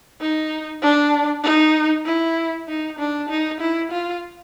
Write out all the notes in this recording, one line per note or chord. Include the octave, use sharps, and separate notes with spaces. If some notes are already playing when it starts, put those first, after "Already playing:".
D#4
D4
D#4
E4
D#4
D4
D#4
E4
F4